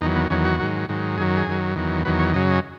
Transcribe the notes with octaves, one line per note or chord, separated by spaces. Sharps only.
E2 D#3 F#3 D#4
B3
E2 D#3 F#3 C#4
F#4
G#2 D#3 F#3
G#2 D#3 F#3
F#2 D#3 F#3 G#4
G#4
F#2 D#3 F#3
E2 D#3 F#3
E2 D#3 F#3 B4
C#5
F#2 C#3 F#3 D#5
D#5